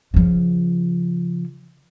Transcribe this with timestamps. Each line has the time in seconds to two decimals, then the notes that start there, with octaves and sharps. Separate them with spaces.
0.14 C#3 F3